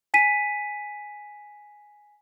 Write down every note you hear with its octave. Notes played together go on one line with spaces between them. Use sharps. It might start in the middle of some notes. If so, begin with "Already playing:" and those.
G#5 B6 D#7